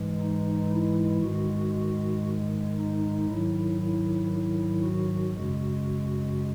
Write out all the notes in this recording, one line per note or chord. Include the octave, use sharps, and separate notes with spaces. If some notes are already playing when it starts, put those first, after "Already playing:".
Already playing: G#2 E3 G#3
D#4
E4
G#2 D#3 G#3 F#4
F#4
D#4
G#2 D#3 F#3 E4
E4
E4
F#4
F#2 C#3 G#3